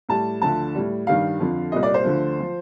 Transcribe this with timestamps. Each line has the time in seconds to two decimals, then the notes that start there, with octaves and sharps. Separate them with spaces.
0.09 A2 G3 A5
0.42 D2 D3 F3 A5
0.75 A2 G3
1.07 G2 D#3 G3 F5
1.40 F2 D3 F3
1.72 C2 A#2 G3 D#5
1.83 D5
1.94 C5
2.05 D2 D3 F3
2.40 F3